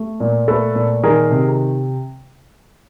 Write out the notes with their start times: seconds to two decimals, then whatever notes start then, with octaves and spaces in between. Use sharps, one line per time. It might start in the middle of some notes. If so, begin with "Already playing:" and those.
Already playing: A3
0.20 A#2
0.48 A3 A4 B4
0.75 A#2
1.04 D#3 G#4 A#4
1.30 C3